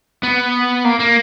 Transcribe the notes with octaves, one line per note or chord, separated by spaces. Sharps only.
B3
A#3
A#3